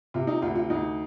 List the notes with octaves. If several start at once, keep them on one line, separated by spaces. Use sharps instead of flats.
C3 F4
D#4
D2 F4
F4
D2 D#4